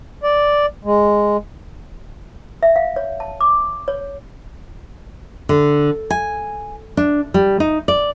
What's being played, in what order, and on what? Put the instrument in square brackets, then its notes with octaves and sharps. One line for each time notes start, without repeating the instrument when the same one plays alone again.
[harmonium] D5
G#3
[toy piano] E5
F5
C#5
A5
D6
C#5
[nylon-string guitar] D3
G#5
D4
G3
D#4
D5